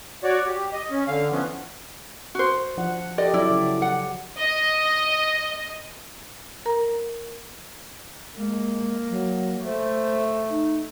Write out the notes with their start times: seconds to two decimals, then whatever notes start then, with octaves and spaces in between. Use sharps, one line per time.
0.24 F#4 C#5 D5
0.47 G4
0.73 D#5
0.90 C#4
1.08 D3 F5
1.31 E3 F3 B3 C#4
2.35 F#4 C5
2.77 F3 D4 F#5
3.18 G4 A4 D5 D#5
3.34 F#3 E4 D5
3.50 C#3
3.82 F#5
4.38 D#5
6.66 A#4 A#5
8.36 G#3 A#3
9.09 F#3
9.64 A3 C5
10.49 D#4